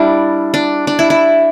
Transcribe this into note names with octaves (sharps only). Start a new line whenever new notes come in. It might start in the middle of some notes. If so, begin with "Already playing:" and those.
Already playing: G3 D4 E4
D4
D4
E4
E4